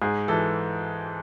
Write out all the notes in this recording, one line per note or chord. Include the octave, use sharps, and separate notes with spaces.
G#2 G#4
E3 A4